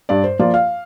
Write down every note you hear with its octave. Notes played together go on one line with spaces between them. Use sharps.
G2 D5
C5
F3 A#3 F4 D5
F5